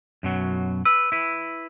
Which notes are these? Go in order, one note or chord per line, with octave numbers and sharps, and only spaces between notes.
F#2 B2 F#3
B4 E6
E4 B4